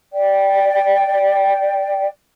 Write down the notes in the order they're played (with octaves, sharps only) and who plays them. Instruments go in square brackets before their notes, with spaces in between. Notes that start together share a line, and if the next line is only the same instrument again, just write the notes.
[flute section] D5 G5